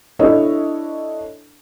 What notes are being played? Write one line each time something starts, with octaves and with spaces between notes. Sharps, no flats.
D4 E4 A4 C#5 D#5